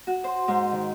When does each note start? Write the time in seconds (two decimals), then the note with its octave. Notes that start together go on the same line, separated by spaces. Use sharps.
0.07 F#4
0.24 C5
0.48 G#2
0.72 D#3